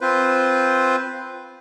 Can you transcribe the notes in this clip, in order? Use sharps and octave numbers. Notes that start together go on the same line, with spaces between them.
C4 F4 B4 C5